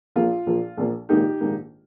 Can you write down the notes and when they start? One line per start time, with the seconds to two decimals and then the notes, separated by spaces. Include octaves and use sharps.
0.16 A#1 A#2 F3 A#3 F4
0.46 A#1 A#2 F3 A#3
0.77 A#1 A#2 F3 A#3
1.09 A#1 G#2 D#3 A#3 D#4 G4
1.40 A#1 G#2 D#3 A#3